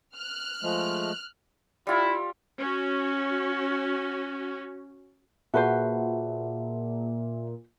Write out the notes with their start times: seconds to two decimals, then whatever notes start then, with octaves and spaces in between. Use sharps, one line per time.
0.16 F6 F#6
0.63 F3 G#3 A3
1.87 G3 E4 F4
2.59 C#4 F#4
5.54 A#2 F#4 G#4 B4 C5 E5 F#5 A5